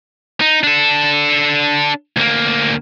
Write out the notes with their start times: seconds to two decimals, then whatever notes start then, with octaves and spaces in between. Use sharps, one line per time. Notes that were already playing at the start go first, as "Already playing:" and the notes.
0.41 D#4
0.64 D4 A4
2.17 D2 A#3